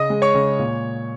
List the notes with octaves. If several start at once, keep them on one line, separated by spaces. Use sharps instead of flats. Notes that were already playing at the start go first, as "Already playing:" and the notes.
Already playing: C#3 D#5 D#6
G#3
C#5 C#6
C#3
A#2